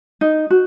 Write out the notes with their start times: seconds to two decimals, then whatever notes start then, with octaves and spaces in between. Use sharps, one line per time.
0.21 D#4
0.50 F#4